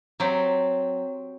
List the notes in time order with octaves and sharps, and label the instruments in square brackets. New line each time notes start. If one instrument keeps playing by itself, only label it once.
[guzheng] F#3 C4 G4